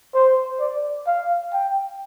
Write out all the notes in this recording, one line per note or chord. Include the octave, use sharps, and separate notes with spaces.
C5
D5
F5
G5